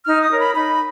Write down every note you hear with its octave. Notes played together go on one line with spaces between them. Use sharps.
D#4 F6
D#6
A#4 C#5
B5
D#4 B5